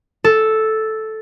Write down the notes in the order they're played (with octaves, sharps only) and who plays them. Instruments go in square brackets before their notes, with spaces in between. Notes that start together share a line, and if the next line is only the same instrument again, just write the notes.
[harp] A4